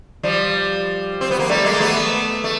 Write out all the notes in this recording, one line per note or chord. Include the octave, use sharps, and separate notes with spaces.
F3 G3
C4
B3
A#3
G3 A3
G#3 A#3
A3 B3
A3